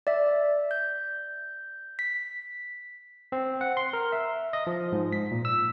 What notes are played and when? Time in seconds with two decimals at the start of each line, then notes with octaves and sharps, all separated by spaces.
0.07 D5 E5
0.71 G6
1.99 B6
3.32 C4
3.61 F#5
3.77 C6
3.93 A#4
4.12 E5
4.53 D#5
4.67 F3
4.92 G#2
5.13 B6
5.31 A#2
5.45 E6